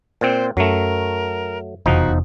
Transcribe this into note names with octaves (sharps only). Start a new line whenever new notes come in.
A#2 C4 C5
F#2 F#3 A3 A#4
F1 B1 E2 B2 F3 D#4 F#4